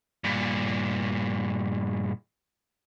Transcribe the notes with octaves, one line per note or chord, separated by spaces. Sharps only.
G2 A#2